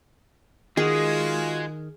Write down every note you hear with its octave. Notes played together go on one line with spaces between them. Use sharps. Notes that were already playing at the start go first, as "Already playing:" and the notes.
D#3 G#3 F4 F#4 G#4